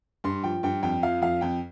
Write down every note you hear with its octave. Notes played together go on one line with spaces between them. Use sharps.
G2 C6
F3 G5
G2 G5
F2 G5
F3 F5
F2 F5
F2 G5